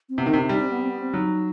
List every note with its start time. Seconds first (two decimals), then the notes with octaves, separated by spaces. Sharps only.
0.09 C4
0.18 C3 B3
0.26 D#3 D#4
0.33 C3 C4
0.39 D#4
0.49 G3 D#4
0.60 C4
0.70 B3
0.82 C4
0.90 B3
0.99 C4
1.13 F#3 D#4